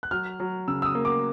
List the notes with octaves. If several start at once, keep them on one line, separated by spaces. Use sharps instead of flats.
F#6
F#3 F6
F#3
C#3 E6
E6
D#6
A#3
D6